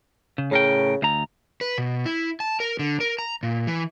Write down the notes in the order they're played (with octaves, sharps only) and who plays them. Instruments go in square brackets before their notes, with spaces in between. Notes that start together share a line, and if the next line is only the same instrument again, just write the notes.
[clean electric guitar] C#3
[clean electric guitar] A2 A#4 G5 [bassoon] C#3
[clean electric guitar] D2 A#5
[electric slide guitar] B4
B2
E4
A5
A#4
D3
A#4
A#5
A#2
E3